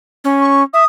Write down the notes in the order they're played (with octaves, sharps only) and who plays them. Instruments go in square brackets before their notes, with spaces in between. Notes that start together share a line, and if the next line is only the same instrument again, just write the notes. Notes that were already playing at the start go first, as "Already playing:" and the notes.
[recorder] C#4
[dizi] C#6
[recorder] E5 [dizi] D#6